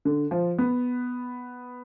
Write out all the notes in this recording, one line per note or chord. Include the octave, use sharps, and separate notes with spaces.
D3
F3
B3